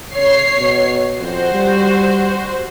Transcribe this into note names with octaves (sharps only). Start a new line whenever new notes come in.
C#3 C#5 C7
B2
F2 F#4 C5
G3